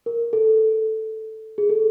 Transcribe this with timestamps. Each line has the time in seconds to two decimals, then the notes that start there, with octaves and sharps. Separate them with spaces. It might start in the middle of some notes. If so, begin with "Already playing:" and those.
0.06 A#4
0.33 A4
1.58 G#4
1.70 A4